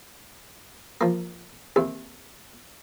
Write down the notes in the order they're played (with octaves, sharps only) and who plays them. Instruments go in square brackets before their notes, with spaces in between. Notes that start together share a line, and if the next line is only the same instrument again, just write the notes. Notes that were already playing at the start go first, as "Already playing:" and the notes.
[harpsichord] F3 A#3
D#2 C3